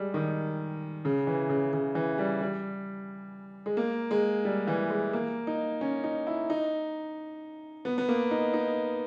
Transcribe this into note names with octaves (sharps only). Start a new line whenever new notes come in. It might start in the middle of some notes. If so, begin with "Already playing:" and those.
Already playing: G3 G#3
D#3
C#3
E3
C#3
C#3
E3
G3
G3
G#3
A#3
G#3
G3
E3
G#3
A#3
D#4
C#4
D#4
E4
D#4
B3
B3
A#3
D#4
D#4